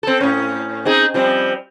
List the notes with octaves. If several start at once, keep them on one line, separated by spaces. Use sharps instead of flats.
C4 A4
A2 C#4
C4 D#4 G#4
F3 G3 C4